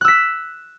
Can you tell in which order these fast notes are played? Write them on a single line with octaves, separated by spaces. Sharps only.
F#6 E6 B6